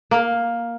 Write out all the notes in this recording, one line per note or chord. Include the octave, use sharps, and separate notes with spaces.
A#3